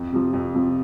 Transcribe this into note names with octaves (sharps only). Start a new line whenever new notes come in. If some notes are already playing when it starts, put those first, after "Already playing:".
Already playing: F2
C3 F3
F2
C3 F3